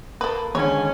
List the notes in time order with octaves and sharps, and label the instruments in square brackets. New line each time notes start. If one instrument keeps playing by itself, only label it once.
[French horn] A#3 [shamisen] A4 B4
[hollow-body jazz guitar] D#2 D3 [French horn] G#2 [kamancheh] C#4 G#5 [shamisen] C#5